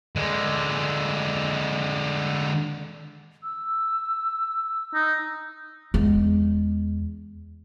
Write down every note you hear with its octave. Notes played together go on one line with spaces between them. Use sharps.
D3 G#3
E6
D#4
E2 G#3